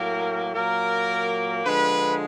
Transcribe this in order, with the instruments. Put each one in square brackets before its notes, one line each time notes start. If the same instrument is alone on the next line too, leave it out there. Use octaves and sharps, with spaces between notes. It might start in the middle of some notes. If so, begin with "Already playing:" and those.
Already playing: [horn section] A2 F#3 A#3 A#4
A#2 F#3 A#3 A#4
D3 F3 G#3 B4